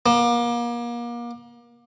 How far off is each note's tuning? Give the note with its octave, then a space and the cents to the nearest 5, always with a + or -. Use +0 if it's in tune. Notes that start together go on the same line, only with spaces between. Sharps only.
A#3 +35